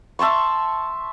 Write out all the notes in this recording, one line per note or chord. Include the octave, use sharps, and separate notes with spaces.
E5 A5 C6 C#6